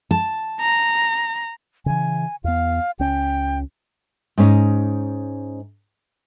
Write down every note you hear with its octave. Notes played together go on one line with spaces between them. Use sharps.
A5
A#5
C#3 E3 G#5
E2 B3 F5
C#2 C#4 G5
G#2 C#4 D#4